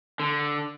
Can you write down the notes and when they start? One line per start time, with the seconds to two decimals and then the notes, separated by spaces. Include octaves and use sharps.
0.20 D3